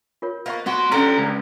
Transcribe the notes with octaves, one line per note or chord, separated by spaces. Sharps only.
F4 A#4 C#5
A#3 B3 C5 D#5 C#6
A#3 B3 F#4 C6
D3 F3 G3 C#4 A4 D5 A#5 C6
C#2